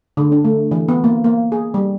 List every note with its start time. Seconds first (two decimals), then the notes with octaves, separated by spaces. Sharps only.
0.17 D3
0.32 D4
0.45 A3
0.71 E3
0.89 B3
1.04 A#3
1.24 A#3
1.52 G#4
1.74 G3